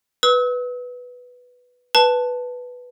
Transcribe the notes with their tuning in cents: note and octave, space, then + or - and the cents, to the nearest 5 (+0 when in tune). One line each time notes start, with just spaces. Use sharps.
B4 +0 E6 -45
B4 +0 A5 +0